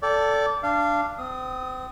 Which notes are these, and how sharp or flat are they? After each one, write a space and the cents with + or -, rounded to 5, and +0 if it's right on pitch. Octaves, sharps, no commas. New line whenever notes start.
A4 +10 D5 -20 G5 +0
D4 +0 F5 -20
C4 -35 D#6 +0